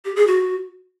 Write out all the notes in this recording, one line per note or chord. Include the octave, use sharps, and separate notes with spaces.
G4
G#4
F#4